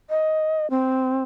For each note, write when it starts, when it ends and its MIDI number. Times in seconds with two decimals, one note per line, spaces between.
0.10 0.69 75
0.70 1.23 60